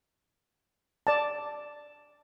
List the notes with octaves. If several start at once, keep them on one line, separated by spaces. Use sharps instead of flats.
D5 A5